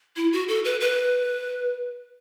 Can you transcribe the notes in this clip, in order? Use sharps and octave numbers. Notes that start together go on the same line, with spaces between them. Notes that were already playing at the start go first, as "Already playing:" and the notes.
E4
F#4
A4
B4
B4